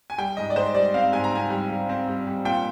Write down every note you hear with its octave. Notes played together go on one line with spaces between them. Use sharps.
G#5
G3 G5
G#2 D#5
D5
G#2 C5
G3 D5
C4 F5
G#2 G#5
A#5
C4 G#5
G3
G3
C4
G3
G3
A#2 G5